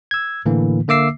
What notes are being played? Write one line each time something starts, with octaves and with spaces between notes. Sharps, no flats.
E6 G#6
A2 D3 E3 A#3
D3 A#3 E5 D6 E6 C7